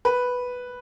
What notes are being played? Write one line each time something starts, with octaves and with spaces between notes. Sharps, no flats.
B4